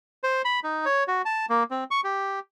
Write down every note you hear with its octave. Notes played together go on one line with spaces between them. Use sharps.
C5
B5
D#4
C#5
F#4
A5
A#3
C4
C#6
G4